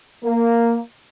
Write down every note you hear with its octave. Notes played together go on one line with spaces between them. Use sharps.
A#3